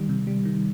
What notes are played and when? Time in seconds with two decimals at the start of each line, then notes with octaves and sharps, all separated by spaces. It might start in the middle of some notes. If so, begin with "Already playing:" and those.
Already playing: D#3 G3
0.09 C3
0.27 G3
0.45 D#3